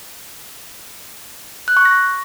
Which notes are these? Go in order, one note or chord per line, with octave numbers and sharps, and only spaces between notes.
F#6
C#6
A#6